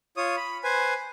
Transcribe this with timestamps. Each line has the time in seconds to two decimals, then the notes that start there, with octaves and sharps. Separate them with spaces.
0.17 F4 C#5 D#6
0.37 B5
0.64 B4 C5 G#5